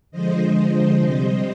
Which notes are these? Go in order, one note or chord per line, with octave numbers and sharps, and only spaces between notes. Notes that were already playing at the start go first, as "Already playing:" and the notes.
D3 F3 G#3 C5 D#5
C3 G3